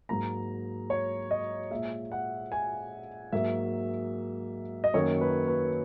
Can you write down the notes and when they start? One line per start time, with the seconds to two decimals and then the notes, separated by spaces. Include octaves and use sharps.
0.09 G#2 F#3 A#3 A#5
0.90 C#5
1.31 D#5
1.71 A#2 G#3 E5
2.12 F#5
2.52 G#5
3.33 G#2 F#3 A#3 E5
4.84 D#5
4.94 F#2 D#3 F#3 A#3 C#5
5.21 B4
5.48 B4